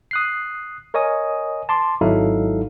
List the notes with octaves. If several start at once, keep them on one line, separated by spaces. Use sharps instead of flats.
D#6 F#6 C7
A#4 C#5 D#5 G#5 D#6
A5 C6 D6
G#1 F#3 D#4 E4 A4 F5